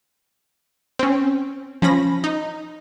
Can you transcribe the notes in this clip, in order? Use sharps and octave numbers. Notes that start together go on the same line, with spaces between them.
C4 C#4
F3 C#4 B5 A#6
D#4